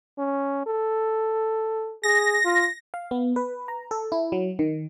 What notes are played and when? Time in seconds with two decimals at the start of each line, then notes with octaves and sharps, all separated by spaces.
0.19 C#4
0.67 A4
2.03 G#4 A#6
2.45 F4
2.94 F5
3.11 B3
3.36 B4
3.68 A#5
3.91 A4
4.12 E4
4.32 F#3
4.59 D#3